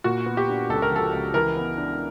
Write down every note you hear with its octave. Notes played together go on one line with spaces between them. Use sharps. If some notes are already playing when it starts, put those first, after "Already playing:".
A#2 F#4
B3
G4
D4
C#2 A4
A#4
F3 A4
C#2
E3 A#4
B3
D4